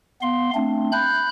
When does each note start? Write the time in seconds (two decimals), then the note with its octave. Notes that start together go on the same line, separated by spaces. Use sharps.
0.22 B3 F5 C6
0.55 A3 C4 D4
0.92 B5 F#6 G6